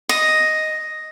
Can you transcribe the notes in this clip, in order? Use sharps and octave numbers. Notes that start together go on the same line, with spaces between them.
D#5